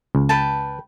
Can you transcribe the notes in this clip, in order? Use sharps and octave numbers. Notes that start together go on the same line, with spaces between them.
C#2
B4 G5 A5